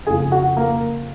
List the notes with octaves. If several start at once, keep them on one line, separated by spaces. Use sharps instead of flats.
F2 C#3 F3 G#4 G#5
F#4 F#5
A#3 A#4